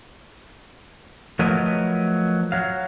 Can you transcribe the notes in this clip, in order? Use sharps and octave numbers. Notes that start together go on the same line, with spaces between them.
F3 F#3 A3 A#4 B4 D#5
F#3 F5